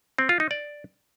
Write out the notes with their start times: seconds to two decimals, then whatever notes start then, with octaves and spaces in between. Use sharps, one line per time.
0.18 C4
0.29 F4
0.40 D#4
0.51 D5